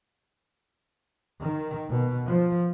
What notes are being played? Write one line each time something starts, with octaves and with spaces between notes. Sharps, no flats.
D#3
B2
F3